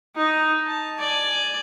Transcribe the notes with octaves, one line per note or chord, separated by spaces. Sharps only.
D#4
A5
D5 G#5